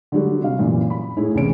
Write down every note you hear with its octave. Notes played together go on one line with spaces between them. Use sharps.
D3 F#3 G3
C3 F5
F#2 A#2 E3
B5
A2 E4 G#4
C#2 C3 E3 C#4 D7